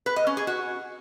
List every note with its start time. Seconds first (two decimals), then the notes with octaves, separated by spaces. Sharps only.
0.06 B4
0.16 D#5
0.27 C#4
0.37 G#4
0.47 F#4